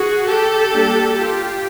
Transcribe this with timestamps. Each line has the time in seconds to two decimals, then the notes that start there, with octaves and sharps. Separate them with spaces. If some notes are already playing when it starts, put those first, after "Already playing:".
Already playing: F#4 G#4
0.27 G4 A4
0.72 G3 A#3 D4
1.16 F4 G4